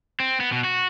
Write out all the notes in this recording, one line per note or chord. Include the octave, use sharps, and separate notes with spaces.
C4
B3
B2
F#4